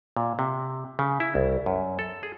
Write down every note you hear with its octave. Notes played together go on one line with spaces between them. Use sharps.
A#2
C3
C#3
E4
C2
F#2
A4
G#4